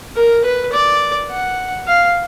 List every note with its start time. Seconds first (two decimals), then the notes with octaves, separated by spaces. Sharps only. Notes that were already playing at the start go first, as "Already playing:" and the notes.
0.16 A#4
0.44 B4
0.73 D5
1.30 F#5
1.87 F5